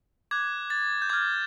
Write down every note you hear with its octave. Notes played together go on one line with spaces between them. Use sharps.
D6 F#6 G#6
A6
G6
D6 F6 G#6